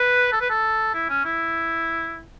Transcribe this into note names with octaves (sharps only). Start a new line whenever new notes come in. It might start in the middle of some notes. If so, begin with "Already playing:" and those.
Already playing: B4
A4
B4
A4
E4
C#4
E4